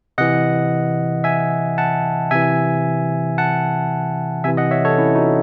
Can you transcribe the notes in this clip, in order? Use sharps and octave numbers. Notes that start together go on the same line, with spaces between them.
C3 E3 D#5 F#5
E5 G#5
F#5 A5
C3 E3 E5 G#5
F#5 A5
C3 E3 E5 G#5
D#5 F#5
C#5 E5
A4 C#5
C#4 E4
D#4 F#4